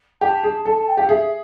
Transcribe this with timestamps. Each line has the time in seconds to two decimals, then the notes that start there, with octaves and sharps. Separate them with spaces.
0.21 G4 A5
0.43 G#4
0.65 A4 A5
0.77 A5
0.87 G5
0.97 G4 F5
1.09 G#4 E5